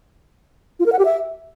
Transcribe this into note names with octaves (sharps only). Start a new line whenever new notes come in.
F4
A#4
F#5
G4
E5